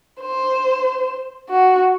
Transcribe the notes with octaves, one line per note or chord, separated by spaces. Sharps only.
C5
F#4